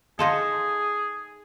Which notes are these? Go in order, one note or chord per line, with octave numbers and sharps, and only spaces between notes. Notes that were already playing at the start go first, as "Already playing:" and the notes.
D#4 F4 G#4 A4